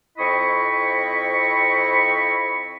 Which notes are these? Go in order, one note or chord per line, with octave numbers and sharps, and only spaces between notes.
F2 C4 E4 D#5 B5 C#6